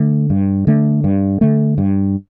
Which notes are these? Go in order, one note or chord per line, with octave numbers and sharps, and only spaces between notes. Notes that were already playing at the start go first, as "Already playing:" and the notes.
Already playing: D3 A3
G2
D3 A3
G2
D3 A3
G2